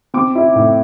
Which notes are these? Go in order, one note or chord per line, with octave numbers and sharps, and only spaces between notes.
C4 D6
E4
A2